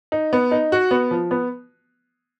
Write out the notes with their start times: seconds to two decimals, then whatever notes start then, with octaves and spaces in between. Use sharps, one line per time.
0.12 D#4
0.33 B3
0.51 D#4
0.72 F#4
0.91 B3
1.11 F3
1.31 B3